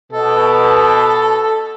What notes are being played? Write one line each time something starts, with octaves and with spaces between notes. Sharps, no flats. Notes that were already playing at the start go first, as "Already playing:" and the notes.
B2 A4